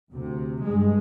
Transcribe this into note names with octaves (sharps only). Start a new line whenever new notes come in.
D2 C3
G2 G#3